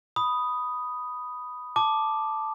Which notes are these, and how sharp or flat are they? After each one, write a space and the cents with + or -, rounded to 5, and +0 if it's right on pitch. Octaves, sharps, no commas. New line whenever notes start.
B5 +0 D#6 +0
A5 +0 D6 +5